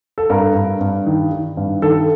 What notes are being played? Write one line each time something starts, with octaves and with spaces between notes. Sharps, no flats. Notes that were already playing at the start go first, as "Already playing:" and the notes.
A4
G2 A#4
G2
G2
D#3
D#3
G2
D#3 A4